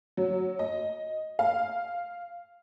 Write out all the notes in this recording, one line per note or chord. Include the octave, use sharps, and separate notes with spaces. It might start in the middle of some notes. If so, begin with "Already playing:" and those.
F#3
D#5
F5